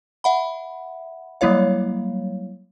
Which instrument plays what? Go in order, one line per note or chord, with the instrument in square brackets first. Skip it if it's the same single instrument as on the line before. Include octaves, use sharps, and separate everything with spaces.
[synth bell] E5 F#5 B5
F#3 G3 A#3 E4 C#5 F5